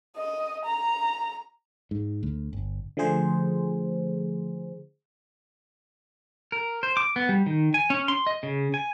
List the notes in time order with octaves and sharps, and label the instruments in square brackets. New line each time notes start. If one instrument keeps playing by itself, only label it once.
[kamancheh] D#5
A#5
[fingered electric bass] G#2
D2
G1
[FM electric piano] D3 F3 A3 G#4 C5
[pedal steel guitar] A#4
C5
D6
B3
G3
D#3
G#5
C#4
C6
D#5
C#3
G#5